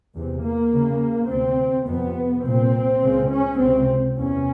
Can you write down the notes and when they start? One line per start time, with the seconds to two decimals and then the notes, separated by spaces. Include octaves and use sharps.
0.14 E2 C3
0.44 A#3
0.73 E2 C#3
1.29 D2 C3 C4
1.87 F2 C3 B3
2.45 C2 A#2 C4
3.02 C#2 C#3
3.31 C#4
3.60 C#2 C3 C4
4.18 E2 C3 C#4